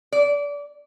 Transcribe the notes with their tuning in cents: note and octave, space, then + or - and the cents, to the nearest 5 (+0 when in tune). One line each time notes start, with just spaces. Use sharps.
D5 -25